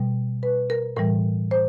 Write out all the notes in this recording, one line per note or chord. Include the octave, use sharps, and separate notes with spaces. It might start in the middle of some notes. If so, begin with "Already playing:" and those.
Already playing: B2 G3
B4
A#4
A2 E3 G3 A#4
C5